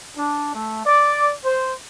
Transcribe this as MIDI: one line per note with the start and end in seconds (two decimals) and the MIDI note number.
0.16 0.51 62
0.53 0.81 57
0.84 1.32 74
1.45 1.73 72